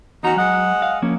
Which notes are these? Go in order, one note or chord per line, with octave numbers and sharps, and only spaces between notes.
E2 C#4 D#4 F#4 A#5
F#3 G#3 D#5 F#5
F5
F3 A#3 C#4